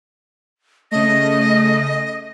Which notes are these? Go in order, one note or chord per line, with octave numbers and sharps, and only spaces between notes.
C#3 A3 D#5 A#6